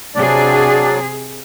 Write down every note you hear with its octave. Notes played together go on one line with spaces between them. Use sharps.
C3 F#3 D4 G#4 D5